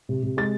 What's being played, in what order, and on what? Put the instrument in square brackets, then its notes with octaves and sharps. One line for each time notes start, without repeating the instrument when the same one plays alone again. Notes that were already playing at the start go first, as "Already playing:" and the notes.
[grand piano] C3
C3
G#3 A6